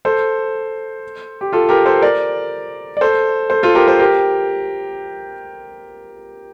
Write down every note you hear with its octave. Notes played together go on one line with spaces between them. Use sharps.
A4 C5
G4
F4 A4
G4 A#4
A4 C5
A#4 D5
D5
A4 C5
A4 C5
F4 A4
G4 A#4
A4 C5
G4 A#4